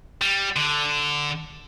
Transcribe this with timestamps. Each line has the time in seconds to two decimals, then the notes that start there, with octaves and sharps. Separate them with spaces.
0.22 G3
0.56 D3